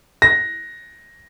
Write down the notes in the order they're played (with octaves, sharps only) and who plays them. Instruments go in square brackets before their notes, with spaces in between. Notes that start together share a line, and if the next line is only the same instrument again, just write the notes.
[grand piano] A#6